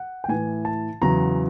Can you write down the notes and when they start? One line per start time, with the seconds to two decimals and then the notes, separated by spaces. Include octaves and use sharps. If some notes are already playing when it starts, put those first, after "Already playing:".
Already playing: F#5
0.24 G5
0.28 A2 E3 G#5
0.65 A5
1.02 E2 C#3 F#3 A#5